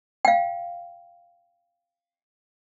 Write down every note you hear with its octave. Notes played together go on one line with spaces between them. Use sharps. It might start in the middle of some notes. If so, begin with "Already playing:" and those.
F5 G5